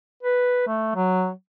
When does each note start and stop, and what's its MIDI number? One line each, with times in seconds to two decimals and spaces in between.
0.23 0.65 71
0.67 0.93 57
0.95 1.30 54